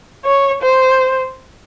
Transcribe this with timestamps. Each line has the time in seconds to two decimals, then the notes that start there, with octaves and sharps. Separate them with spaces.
0.25 C#5
0.62 C5